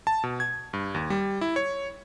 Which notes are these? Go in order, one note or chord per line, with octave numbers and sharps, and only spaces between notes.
A5
B2
G#6
G2
D#2
G3
E4
C#5